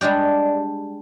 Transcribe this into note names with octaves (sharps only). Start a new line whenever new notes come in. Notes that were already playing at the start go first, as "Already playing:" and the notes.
G3 G#3 D4 G4